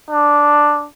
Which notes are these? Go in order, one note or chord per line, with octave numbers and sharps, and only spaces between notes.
D4